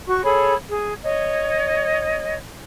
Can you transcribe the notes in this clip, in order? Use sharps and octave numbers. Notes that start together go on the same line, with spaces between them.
F#4 C#6
G#4 A4 C#5 B5
G#4
C#5 D#5